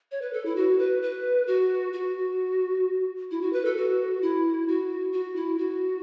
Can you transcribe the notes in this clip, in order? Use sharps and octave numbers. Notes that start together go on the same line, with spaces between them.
C#5
B4
A4
E4
F#4
B4
B4
F#4
F#4
E4
F#4
B4
A4
F#4
E4
F#4
F#4
E4
F#4